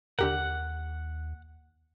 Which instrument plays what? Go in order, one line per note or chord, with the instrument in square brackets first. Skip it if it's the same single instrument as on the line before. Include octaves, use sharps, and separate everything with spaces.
[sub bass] D#2 [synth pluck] D3 G4 A#4 [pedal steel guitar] F#5